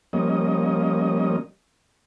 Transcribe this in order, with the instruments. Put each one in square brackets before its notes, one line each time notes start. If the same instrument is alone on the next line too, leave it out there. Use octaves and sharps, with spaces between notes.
[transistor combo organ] F3 G3 A#3 C#4 D#5